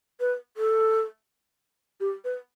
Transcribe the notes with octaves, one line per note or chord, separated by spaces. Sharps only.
B4
A4
G4
B4